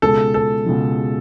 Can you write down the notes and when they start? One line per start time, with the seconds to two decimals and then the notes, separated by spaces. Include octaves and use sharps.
0.02 C#2 B2 G#3 A4
0.34 A4
0.66 C#2 B2 G#3